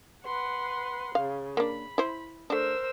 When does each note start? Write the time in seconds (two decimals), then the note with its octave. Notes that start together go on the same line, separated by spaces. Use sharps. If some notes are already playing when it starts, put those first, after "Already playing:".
0.25 B4 F#5 C6
1.15 C#3 F5
1.57 A#3 D4 B5
1.98 E4 C5
2.50 A3 D4 A#4 C5 E6